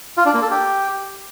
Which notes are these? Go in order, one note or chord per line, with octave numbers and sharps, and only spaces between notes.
F4
D4
A#3
A4
G4